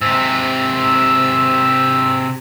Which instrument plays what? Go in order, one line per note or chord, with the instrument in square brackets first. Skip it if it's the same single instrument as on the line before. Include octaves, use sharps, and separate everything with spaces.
[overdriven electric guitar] G#2 C3 [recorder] E6